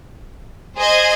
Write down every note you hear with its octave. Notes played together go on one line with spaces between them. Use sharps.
G#4 C5 D#5 G#5